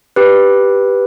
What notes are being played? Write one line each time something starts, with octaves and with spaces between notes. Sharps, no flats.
G4 B4